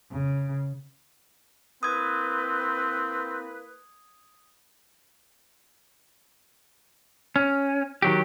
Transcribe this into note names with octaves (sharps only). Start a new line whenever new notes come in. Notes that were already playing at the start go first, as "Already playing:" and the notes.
C#3
A#3 C4 E4 B4 D#6 G#6
C#4
D#3 F#3 G4